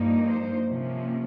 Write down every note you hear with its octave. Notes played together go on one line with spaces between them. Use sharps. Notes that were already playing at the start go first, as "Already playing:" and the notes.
Already playing: G2 F3 A#3 D#4
C5
C3 F3 A#3 C#4